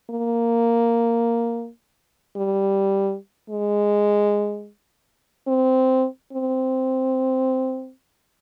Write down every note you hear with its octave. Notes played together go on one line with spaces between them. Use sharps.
A#3
G3
G#3
C4
C4